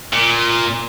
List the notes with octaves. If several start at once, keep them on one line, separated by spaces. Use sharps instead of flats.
A#2